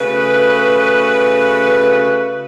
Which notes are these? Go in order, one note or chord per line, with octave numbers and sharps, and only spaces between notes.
C#3 A3 F#4 B4